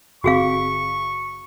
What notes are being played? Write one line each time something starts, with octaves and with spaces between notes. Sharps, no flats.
F#1 C4 F#4 G#4 F5 C#6